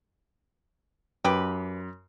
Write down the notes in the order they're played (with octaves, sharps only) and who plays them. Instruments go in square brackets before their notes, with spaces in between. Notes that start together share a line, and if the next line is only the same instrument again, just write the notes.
[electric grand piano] F#2 [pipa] G4 B4